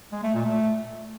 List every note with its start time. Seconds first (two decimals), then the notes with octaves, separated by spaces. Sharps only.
0.12 G#3
0.23 A3
0.34 A#2
0.45 A3